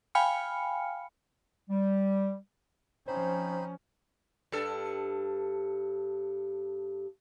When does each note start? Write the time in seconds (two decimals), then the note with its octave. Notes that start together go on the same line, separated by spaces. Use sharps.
0.15 F5 G5 G#5 B5 F6 C#7
1.68 G3
3.08 F3 C4 C#4 D#4 C5 B5
4.52 G2 A4